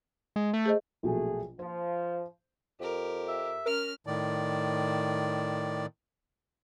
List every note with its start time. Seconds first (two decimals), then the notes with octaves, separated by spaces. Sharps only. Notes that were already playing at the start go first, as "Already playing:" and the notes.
0.36 G#3
0.54 A3
0.66 G#4 C5 D#5
1.03 A#1 B2 F#3 A3 G#4
1.59 F3 C5
2.80 F2 G4 A#4
3.28 E5
3.66 C#4 A#4 F6
4.07 A2 D#3 D5